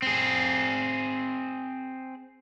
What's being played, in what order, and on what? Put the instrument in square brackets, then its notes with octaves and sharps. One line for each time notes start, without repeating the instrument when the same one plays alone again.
[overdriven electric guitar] C4 G#4